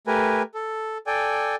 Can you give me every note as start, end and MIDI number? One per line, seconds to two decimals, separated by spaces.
0.07 0.42 57
0.07 0.42 67
0.07 0.42 70
0.07 0.42 71
0.07 0.42 80
0.54 0.98 69
1.07 1.55 69
1.07 1.55 74
1.07 1.55 79
1.07 1.55 80